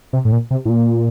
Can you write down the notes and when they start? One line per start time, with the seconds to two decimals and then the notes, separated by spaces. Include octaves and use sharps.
0.13 C3
0.25 A2
0.32 A#2
0.50 C3
0.65 A2
0.69 A#2